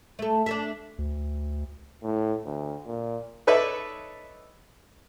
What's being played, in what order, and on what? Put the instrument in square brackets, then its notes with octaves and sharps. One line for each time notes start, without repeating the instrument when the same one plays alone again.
[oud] A3 A4
D4 A4 E5
[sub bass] D2
[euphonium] A2
D2
A#2
[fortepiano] D#4 A4 B4 C#5 D5 E5